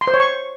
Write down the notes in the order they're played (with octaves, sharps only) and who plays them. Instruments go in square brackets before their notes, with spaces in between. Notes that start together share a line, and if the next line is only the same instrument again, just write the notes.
[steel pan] C6
C5
C#5
C#6